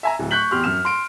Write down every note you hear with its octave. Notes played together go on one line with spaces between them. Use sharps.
E5 G#5 A#5
D1
C#6 F#6 G6 B6 F#7
E2 G4 C6 F6
F#2 F6 E7
C6 D7